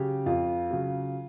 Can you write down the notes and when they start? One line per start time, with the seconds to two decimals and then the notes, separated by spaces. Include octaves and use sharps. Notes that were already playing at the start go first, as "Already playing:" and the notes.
Already playing: C#3 F#3 G4
0.26 F2 F4
0.70 C#3 F#3